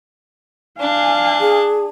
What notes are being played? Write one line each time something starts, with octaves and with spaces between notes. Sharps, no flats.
D4 F5 G#5
G#4